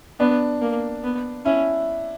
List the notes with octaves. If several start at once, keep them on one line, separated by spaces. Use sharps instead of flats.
B3 D4
A#3
B3
C#4 E4